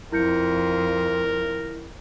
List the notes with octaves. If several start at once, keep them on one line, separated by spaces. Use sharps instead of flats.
F2 E4 A#4 G6 C#7